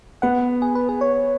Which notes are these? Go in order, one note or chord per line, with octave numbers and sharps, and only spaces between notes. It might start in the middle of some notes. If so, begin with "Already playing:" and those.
B3 F#5
G#4
B4
G#4
C#5